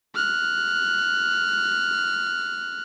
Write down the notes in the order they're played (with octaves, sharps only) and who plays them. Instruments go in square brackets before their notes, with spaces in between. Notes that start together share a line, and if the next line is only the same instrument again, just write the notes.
[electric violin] F6 F#6